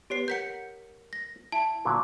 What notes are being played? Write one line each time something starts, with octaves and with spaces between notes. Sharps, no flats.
B3 G4 C#5 C7
A#4 F#5 G6 B6 C#7
A#6
E4 A5
A#2 D3 F#3